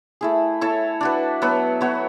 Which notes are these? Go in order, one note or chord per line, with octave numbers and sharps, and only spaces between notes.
A3 E4 G#4
E4 A4 C#5
D4 F#4 B4
F#3 B3 F#4 B4
B3 F#4 C#5